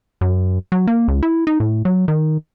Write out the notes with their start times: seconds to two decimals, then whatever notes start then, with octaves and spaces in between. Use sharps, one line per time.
0.21 F#2
0.72 F#3
0.87 A#3
1.08 C#2
1.23 E4
1.47 D#4
1.60 A2
1.85 F#3
2.08 D#3